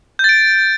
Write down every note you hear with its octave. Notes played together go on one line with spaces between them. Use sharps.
G6 A6 D7